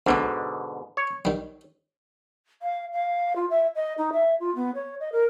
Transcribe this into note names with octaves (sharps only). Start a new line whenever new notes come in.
D2 G#2 B2 D3 B3 B4
C#5
D#3 G3
F5
F5
F4
E5
D#5
D#4
E5
F4
B3
C#5
D#5
A#4